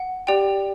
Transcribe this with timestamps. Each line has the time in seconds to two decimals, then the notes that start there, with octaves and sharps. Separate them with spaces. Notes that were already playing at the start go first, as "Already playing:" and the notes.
Already playing: F#5
0.27 G4 D5 G5